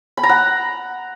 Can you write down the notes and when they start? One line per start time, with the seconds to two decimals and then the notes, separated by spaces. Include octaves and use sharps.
0.17 B5
0.23 A#5
0.29 F#5